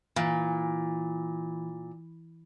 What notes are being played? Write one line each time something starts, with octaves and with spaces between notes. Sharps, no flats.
A#2 E3